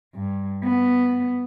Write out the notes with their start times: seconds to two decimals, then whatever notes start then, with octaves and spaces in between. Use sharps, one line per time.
0.16 G2
0.64 B3